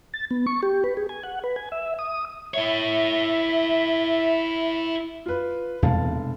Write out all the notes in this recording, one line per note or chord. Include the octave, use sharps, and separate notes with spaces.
A6
B3
C#6
G4
B4
G#4
G#5
F#5
B4
G#5
E5
D#6
E4 C#5 E5
F4 B4
F1 E2 B2 G#3 F5 A5